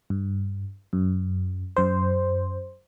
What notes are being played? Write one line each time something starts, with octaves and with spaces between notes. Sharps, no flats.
G2
F#2
F#2 C5